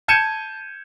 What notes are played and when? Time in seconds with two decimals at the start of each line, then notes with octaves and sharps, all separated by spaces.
0.08 A5 G6 G#6 C#7 D#7 E7